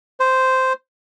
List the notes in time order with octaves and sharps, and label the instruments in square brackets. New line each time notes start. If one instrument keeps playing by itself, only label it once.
[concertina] C5